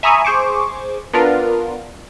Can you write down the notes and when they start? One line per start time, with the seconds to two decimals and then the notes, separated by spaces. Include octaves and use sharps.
0.03 E5 G#5 A#5 B5 C#6 D#6
0.25 G#4 C5 C#6 D6
1.13 B3 D4 F4 A#4